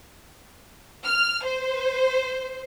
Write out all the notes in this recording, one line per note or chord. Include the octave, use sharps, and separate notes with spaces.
F6
C5